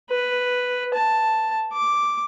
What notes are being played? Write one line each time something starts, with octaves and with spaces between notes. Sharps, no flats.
B4
A5
D6